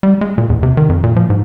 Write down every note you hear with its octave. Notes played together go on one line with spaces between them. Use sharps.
G3
G#3
A#2
E2
C3
D#3
F2
A#2
F3
G#2